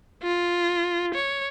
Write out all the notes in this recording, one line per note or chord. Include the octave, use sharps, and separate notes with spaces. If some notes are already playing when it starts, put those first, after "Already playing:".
F4
C#5